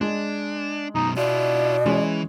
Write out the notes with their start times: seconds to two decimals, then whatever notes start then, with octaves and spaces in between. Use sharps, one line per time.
0.01 G#3 D4
0.95 F#2 B2 D#4
1.17 B2 E4 F4 D5
1.86 E3 G#3 C#4